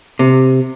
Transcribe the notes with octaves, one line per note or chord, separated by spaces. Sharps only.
C3